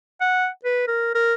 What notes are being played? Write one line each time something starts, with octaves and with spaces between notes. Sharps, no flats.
F#5
B4
A#4
A#4